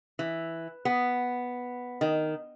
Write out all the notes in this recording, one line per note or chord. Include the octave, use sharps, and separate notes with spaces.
E3
B3
D#3